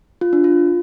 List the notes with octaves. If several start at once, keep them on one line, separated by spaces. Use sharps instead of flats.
F4
D4
F4